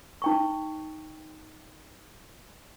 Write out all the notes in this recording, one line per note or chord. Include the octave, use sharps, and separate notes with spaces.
D#4 G5 C#6